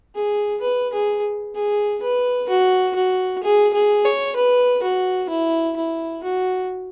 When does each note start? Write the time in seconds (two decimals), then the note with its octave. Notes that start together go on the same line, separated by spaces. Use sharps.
0.15 G#4
0.61 B4
0.93 G#4
1.55 G#4
2.02 B4
2.49 F#4
2.95 F#4
3.43 G#4
3.74 G#4
4.05 C#5
4.36 B4
4.83 F#4
5.29 E4
5.77 E4
6.24 F#4